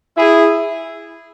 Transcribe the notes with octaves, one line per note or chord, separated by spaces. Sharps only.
E4 G#4